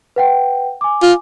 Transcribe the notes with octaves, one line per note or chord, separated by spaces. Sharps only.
B4 F#5 G5
G#5 D6
F4